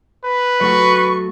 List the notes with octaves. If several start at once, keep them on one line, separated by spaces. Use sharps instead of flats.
B4
F#3 A3 F#4 C#6